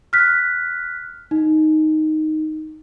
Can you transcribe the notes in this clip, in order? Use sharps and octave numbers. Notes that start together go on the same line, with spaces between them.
F6 F#6 B6
D#4